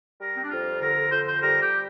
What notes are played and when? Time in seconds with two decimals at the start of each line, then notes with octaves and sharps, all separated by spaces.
0.21 G3 A#4
0.36 C4
0.44 D4
0.51 F2 F4
0.82 D3 A#4
1.12 F2 C5
1.28 C5
1.42 G3 A#4
1.62 G4